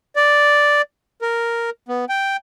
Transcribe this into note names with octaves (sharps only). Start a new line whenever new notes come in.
D5
A#4
B3
G5